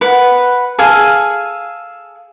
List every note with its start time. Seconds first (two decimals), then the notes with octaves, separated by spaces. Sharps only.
0.01 B4 F#5
0.78 G#4 A4 F5 G#5